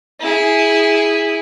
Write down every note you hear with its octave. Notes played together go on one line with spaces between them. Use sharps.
E4 G#4